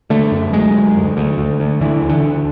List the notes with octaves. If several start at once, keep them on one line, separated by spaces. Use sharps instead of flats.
D3 A3
F#2
F#2 G#3
F#2
D2
D2
D2
D2
D3 E3
D2
D3
D3